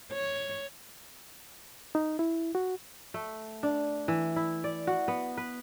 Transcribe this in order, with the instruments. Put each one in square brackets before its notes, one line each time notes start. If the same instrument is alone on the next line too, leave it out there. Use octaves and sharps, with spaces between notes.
[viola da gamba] C#5
[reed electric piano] D#4
E4
F#4
[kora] A3
D4
E3
E4
D5
F#4
B3
B4